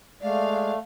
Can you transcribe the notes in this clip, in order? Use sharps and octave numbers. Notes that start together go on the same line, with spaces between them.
G#3 A3 D5 F5